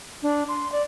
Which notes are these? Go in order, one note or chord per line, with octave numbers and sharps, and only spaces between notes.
D4
C6
D5